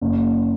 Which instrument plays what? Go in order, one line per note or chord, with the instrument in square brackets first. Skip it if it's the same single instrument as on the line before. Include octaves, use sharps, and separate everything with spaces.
[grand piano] F#1